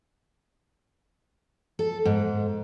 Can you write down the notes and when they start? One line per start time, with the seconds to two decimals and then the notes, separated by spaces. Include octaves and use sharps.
1.79 A4
2.05 G#2